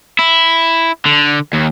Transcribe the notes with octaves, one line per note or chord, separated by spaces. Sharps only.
E4
D3
D#2